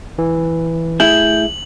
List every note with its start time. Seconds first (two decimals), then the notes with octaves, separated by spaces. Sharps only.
0.18 E3
1.00 A2 E4 G#4 G6 F#7